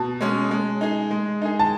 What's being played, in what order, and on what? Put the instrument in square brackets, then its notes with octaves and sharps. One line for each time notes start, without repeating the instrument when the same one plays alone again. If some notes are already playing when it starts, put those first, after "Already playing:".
Already playing: [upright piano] B2 [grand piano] A5
[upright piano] G#3 C#4
G#3
D#4 G#4
G#3
D#4 G#4
[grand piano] A5